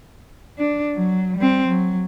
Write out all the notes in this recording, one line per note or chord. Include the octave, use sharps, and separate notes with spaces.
D4
F#3
G3 C4
F#3